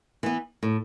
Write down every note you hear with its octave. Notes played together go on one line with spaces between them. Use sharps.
E3 B3
A2